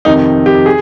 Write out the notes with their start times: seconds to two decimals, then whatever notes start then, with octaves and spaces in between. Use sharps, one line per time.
0.05 F2 C3 D#3 D#4
0.46 G4
0.66 G#4